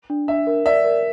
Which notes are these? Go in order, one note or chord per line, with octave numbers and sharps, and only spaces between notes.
D4
D4 E5
A#4
D5 E5
A#4